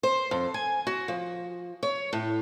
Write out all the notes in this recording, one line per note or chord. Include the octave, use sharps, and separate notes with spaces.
C5
F2
G#5
F#4
F3
C#5
A2